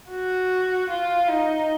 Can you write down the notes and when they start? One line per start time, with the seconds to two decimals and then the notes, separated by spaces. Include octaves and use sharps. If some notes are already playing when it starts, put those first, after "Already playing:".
0.10 F#4
0.89 F4
1.28 D#4